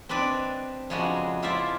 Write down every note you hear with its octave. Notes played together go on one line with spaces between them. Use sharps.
C4 D4 B4 D5 D#5
F2 C#3 G#3 D4 F#4 G#4
E4 F4 C5 D5 E5